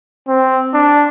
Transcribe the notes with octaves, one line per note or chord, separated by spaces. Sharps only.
C4
D4